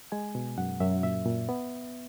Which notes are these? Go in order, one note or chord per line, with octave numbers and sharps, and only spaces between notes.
G#3 G#5
B2
F#2 F#5
F#2 E5
A#2 E5
A#2
B3